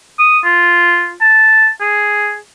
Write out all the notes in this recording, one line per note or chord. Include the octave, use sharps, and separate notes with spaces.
D#6
F4
A5
G#4